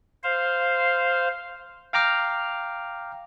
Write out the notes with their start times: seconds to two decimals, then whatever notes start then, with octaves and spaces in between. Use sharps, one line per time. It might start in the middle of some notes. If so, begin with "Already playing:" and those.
0.23 C5 F5
1.93 F5 G5 A#5 D6 F6